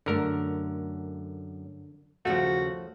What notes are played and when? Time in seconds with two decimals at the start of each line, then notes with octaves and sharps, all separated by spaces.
0.06 F#2 D3 A3 A#4
2.25 D#2 A#2 C#3 F3 A3 F#4